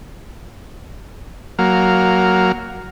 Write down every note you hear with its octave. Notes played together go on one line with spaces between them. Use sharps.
F#3 A#3 F5